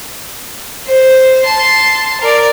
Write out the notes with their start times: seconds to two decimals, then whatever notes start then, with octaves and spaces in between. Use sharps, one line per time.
0.86 C5
1.44 A5 C6
2.21 A#4 D5